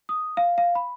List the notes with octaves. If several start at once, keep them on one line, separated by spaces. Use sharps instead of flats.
D#6
F5
F5
B5